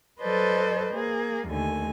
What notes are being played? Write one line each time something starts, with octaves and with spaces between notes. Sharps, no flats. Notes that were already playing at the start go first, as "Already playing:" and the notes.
F#3 A4 B4 C5 D5 D#5
A#3 G#4
D#2 D3 A3 G#5